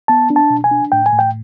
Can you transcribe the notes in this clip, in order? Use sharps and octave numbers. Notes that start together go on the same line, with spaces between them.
B3 A5
D4
A5
B2
G#5
D4
A2 G5
G#5
A2
G5